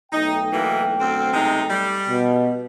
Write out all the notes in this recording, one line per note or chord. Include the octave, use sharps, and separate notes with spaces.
B1 A3 D#4 G5
B2 E3 A#3
D2 C4
C3 G#3 D#4
G3
B2